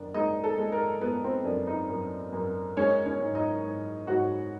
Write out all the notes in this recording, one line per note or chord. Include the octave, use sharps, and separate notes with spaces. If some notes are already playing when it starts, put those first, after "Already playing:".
Already playing: F#2 D#3 D4 D5
G#3 D#4 D#5
A4
G#3
A#4
G#3 B3 B4
C4 C5
F#2 D4 D5
D#4 D#5
F#2
F#2
G#3 C#4 C#5
C#4 C#5
G#2
D#4 D#5
G#2
G#2 F#4 F#5